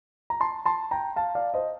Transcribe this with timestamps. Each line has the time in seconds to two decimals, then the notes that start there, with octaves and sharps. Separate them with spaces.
0.30 A#5
0.40 A5 C6
0.65 A5 C6
0.91 G5 A#5
1.16 F5 A5
1.35 D5 F5
1.54 C5 D#5